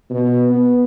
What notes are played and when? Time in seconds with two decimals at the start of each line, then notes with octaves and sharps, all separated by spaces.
0.10 B2
0.50 B3